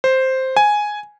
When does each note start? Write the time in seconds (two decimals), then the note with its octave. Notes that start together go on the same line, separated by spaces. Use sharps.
0.04 C5
0.57 G#5